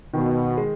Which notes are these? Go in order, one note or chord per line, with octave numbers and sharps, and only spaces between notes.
B2 D#3
G#3